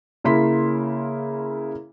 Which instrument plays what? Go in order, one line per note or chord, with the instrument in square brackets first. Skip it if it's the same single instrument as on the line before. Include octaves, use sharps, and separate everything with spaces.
[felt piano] C#3 A#3 E4 C6 B6